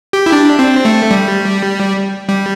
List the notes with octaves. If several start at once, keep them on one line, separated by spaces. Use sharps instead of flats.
G4
E4
D4
C4
A3
G3
G3